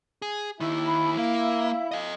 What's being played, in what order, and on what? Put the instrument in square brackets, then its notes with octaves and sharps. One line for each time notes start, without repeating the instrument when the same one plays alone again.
[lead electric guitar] G#4
[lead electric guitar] D#2 D#3 [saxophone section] E4
[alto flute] B5
[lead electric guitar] A#3 [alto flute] F5
[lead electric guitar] A4 D#5